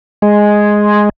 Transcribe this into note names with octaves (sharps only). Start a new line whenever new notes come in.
G#3